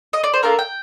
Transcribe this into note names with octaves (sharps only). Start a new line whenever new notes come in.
D#5
D5
C5
A#3 D4 F4 A4 A#4
G5